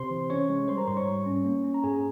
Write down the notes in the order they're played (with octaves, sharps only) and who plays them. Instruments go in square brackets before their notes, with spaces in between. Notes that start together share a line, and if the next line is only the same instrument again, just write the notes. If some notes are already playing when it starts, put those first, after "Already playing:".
Already playing: [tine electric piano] C3 C5 C6
E3
C#4 C#5 C#6
G#3
G3 C5 C6
A#4 A#5
G#2 C5 C6
C#5 C#6
G3
C#4
A#3
C#4
A#5
G#2 G#4 G#5